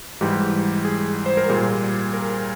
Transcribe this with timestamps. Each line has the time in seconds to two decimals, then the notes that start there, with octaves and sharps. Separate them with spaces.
0.21 G#2 E3 G3 G4
0.85 G#4
1.26 C5
1.37 A#4
1.49 A#2 G3 G#4
2.13 A#4